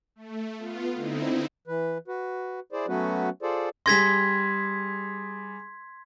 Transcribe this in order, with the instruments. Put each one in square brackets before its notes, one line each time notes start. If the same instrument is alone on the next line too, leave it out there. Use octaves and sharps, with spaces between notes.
[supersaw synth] A3
B3 F4
D3 C4 D#4 E4
[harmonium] E3 B4
F#4 B4
E4 G#4 C5 D5
F#3 A3 B3 C#4 F#4 B4
F4 G#4 A4 C5 D5
[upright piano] G3 G#4 A#6 [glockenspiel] C6 G#6 B6